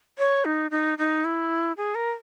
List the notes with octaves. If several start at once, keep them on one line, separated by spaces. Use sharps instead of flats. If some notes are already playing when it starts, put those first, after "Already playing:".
C#5
D#4
D#4
D#4
E4
G#4
A#4